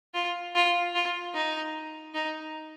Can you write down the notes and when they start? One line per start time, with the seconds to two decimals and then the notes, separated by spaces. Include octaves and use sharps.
0.14 F4
0.55 F4
0.95 F4
1.34 D#4
2.14 D#4